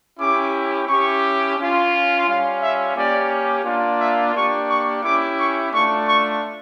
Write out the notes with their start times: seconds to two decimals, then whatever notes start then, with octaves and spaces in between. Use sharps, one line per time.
0.18 C#4 E4 G4 D6
0.87 C#4 E4 G4 C#6
1.57 C#4 F4
2.26 G3 C#4 F4 F5
2.61 E5
2.95 A#3 C#4 G4 D5
3.64 A#3 D4 F4
3.99 E5
4.33 A#3 D4 G4 C#6
4.68 C#6
5.03 C#4 E4 G4 D6
5.38 C#6
5.72 A3 D4 F4 C#6
6.07 C#6